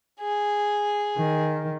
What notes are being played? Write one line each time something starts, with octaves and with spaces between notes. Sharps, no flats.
G#4
D#3